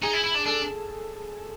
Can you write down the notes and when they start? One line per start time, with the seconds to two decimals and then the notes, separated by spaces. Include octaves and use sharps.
0.02 D#4 G#4 G#5
0.13 E4
0.24 E4
0.35 D4
0.46 D4 A4 A5